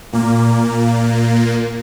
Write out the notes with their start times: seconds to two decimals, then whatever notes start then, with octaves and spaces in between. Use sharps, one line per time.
0.13 A#2 A#3